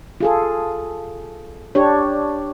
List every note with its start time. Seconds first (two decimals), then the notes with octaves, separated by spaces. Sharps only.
0.20 F4 G#4 A4
1.75 D4 G4 C#5